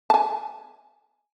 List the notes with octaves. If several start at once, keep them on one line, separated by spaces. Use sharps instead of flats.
A5
G#5